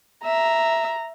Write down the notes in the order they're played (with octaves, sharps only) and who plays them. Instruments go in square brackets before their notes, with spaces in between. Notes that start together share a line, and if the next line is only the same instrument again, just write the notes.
[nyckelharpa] E5 [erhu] A#5